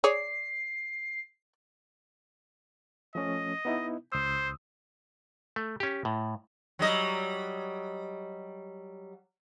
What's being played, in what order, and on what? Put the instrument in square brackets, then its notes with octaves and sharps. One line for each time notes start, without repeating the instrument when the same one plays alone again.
[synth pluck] G#4 C#5 [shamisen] D5 [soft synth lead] C7
[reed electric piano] F3 A3 C#4 [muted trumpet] D#5
[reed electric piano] B3 D#4 E4
[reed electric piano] C#2 D#6 E6 [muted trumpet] C5
[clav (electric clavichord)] A3
C#4 G4
A2
[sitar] F#3 G3 D#5